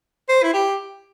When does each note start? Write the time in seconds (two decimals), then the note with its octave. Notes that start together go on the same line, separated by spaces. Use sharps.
0.29 C5
0.43 E4
0.53 G4